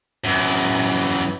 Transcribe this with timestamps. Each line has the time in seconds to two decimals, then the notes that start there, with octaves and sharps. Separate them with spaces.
0.24 F#2 E3